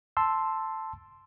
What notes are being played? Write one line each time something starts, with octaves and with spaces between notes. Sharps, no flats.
A5 C6 E6